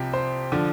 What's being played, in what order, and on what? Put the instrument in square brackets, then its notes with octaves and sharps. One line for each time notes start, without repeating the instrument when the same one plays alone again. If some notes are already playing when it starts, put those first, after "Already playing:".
Already playing: [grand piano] C2 C3 F3 G4
C5
D3 F3